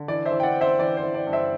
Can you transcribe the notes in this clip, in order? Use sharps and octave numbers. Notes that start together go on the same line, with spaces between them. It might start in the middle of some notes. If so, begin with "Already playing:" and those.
Already playing: D3
E3 D5
C5 E5
E3
G5
D5 F#5
C4
C5 E5
E3 D5
C5
E3
D5
G2
C5 E5